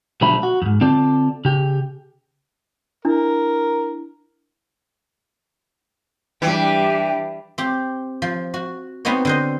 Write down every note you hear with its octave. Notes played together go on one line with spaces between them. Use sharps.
B1 D3 F3 G3 A3 B5
F#4
F2 G#2
D3 C4 F4 A4 D5
C#3 G4
D4 E4 A#4
E3 G3 D4 G4 G5
C4 G4
F3
F#4
B3 C4 D#4 F#4 C#5
D3 C5 D#5